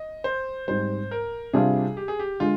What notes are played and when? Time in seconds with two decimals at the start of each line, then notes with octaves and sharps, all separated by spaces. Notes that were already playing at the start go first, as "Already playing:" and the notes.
Already playing: D#5
0.24 C5
0.68 G#2 G3 C4 D#4 C5
1.11 A#4
1.53 C3 G3 D4 F4 G#4
1.97 G4
2.08 G#4
2.19 G4
2.40 D3 G#3 F4